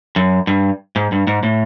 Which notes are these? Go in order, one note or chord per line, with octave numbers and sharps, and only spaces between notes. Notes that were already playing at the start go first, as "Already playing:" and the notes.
F#2
G2
G#2
G2
G#2
A2